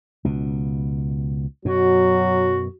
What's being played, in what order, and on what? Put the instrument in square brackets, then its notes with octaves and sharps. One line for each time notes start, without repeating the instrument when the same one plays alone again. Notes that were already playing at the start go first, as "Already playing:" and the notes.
[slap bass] C#2 B2
[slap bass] F#2 B2 [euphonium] F#3 [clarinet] F#4